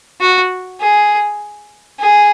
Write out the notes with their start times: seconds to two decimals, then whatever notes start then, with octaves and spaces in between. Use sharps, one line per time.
0.21 F#4
0.81 G#4
2.00 G#4